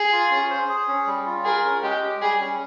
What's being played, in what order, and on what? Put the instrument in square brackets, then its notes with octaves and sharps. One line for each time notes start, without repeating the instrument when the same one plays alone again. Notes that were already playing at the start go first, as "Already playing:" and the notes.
Already playing: [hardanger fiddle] G#4
[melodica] F4
C#4
C5
G#4
C#4
G3
F4
[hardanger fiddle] G#4 [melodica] A#4
[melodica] C#4
[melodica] G#3 [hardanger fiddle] G4
[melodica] G4
[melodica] G3 [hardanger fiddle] G#4
[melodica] C#4